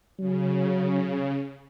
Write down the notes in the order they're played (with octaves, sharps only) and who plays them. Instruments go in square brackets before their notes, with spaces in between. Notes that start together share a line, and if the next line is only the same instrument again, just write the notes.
[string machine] C#3 [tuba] F#3